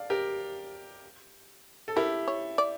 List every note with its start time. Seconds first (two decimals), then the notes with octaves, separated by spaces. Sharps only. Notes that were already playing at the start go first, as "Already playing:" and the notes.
Already playing: D5 F5
0.10 G4 A#4
1.88 A4
1.96 E4 G4 A#4
2.28 C#5
2.58 D5